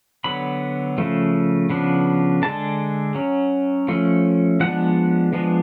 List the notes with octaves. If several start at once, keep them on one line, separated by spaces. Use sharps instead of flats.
D3 F#3 B3 B5
C#3 F3 A3
C#3 F3 B3 D4
D3 G#3 D4 A5
F#3 C#4
F3 A3 C#4
F3 G#3 B3 D4 F#5
F3 G#3 B3 D4